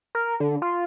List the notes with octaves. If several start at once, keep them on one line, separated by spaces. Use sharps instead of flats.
A#4
D3
F4